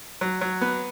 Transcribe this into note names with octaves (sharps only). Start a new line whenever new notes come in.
F#3
F#3
B3